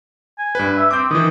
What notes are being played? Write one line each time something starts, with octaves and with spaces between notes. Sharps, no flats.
G#5
G2 B4
E5
C4 D6 G6
D#3 E3 D#6